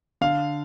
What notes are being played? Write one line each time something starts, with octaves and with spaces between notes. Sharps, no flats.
D3 F5